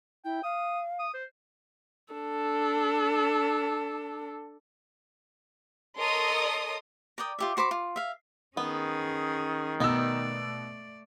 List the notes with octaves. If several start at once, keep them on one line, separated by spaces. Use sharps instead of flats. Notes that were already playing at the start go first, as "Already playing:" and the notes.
E4 G5
F5 D#6
D#6
C5
D4 A4
A4 A#4 C#5 D#5 C6 D#6
A#4 D5 G5 D#6
F4 G4 E5
F#4 C5 B5 D6
F4
E5 F5
D#3 B3 C#4 G#4
B2 A3 B3 D#4 D5 E6